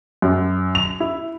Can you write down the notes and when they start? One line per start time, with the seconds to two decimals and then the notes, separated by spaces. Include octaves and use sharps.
0.22 F#2
0.75 F7
1.00 E4